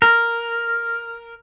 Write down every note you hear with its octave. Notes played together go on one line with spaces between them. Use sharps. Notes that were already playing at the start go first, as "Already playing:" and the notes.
A#4